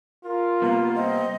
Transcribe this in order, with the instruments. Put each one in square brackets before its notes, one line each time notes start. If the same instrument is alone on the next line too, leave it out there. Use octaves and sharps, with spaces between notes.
[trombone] F4 [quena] A#4
[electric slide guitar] C3 G3 B3 [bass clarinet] A#3
[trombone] C4 [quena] D#5